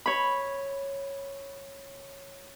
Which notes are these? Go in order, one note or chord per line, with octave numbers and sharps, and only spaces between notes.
C#5 B5